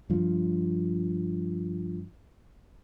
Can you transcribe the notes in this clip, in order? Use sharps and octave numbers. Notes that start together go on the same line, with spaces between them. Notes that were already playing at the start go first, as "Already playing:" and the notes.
G2 F3